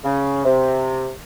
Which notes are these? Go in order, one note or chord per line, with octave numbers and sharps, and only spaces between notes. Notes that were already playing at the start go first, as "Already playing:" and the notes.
C#3
C3